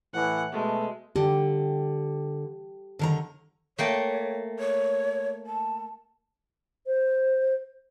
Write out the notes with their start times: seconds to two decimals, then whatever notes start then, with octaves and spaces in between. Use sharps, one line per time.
0.13 A2 E3 F#5
0.53 B2 G#3 A3
1.16 D3 G4
2.99 D3 D#3 A#5
3.78 A3 A#3 C#5 G5
4.59 C#5
5.47 A5
6.87 C5